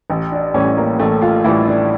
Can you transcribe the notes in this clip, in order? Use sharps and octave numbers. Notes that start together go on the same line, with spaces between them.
A1
D4
A2 E3 G3 C#4
A#3
A1 A3
F4
A2 E3 G3 E4
D4